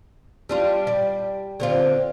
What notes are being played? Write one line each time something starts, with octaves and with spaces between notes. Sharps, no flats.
G3 D4 F4
G3
D3 C4 F4